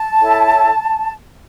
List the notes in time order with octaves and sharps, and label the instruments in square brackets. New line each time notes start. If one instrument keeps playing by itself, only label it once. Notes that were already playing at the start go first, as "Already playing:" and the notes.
Already playing: [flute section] A5
E4 A4 C#5